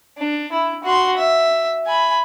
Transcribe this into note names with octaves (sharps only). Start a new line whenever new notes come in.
D4
E4
F#4 C6
E5
G#5 B5